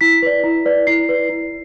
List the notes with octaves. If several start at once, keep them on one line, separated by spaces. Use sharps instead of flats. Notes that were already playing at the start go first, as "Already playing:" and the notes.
E4 B6
B4 D5
E4
B4 D5
E4 C7
B4 D5
E4